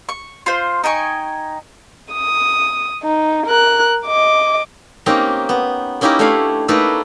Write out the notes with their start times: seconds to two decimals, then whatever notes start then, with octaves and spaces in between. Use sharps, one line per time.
0.09 C#6
0.46 F4 C5
0.84 D#4 G5 G#5 C#6
2.13 D#6
3.03 D#4
3.47 A#4 F#6
4.06 D#5 D6
5.06 A#3 C4 C#4 D#4 G4 A#5
5.49 B3
6.01 A#3 C#4 D#4 E4 G4 A#4
6.19 A3 D4 E4 C#5 F5 B5
6.68 A3 A#3 D#4 E4 A4 B4